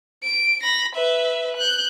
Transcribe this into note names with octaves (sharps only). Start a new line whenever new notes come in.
D7
B5 A#6
B4 E5
F#6 G6